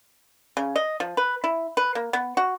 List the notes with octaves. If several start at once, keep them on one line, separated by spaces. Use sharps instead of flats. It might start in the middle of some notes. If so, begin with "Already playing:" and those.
C#3
D#5
F3
B4
E4
B4
A#3
B3
F#4